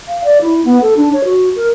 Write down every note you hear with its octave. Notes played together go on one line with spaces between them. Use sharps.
F5
D5
E4
B3
A4
D4
C#5
F#4
A#4